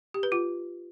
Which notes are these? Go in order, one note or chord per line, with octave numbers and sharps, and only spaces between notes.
G4
B4
F4